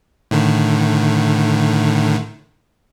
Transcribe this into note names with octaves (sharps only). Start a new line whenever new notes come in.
A2 D3 D#3